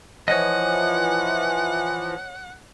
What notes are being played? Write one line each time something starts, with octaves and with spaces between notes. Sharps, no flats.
E3 F3 C#5 D#5 F#5